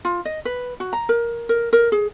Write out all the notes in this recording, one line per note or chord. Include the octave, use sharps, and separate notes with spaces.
F4
D#5
B4
F#4
A#5
A#4
A#4
A#4
G#4